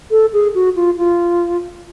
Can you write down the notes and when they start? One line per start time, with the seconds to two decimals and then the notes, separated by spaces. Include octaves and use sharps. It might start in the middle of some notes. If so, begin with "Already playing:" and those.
0.11 A4
0.33 G#4
0.54 F#4
0.76 F4
0.97 F4